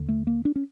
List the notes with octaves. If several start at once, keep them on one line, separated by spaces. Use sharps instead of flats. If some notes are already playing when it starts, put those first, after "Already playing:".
Already playing: D#2 D3
A3
A#3
D4
C#4